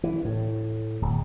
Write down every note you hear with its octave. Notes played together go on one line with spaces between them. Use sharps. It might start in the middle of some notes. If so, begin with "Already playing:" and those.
E3
A2
D1